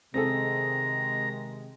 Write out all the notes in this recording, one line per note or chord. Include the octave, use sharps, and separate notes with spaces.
C3 D#3 G#3 C4 G#4 A4 A#5